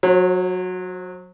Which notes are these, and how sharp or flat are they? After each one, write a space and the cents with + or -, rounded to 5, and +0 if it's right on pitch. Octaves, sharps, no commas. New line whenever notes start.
F#3 -15 C5 +40